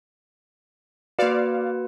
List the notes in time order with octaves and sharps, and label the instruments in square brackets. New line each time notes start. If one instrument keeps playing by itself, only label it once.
[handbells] A#3 B4 [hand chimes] F#4 [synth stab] D5 F5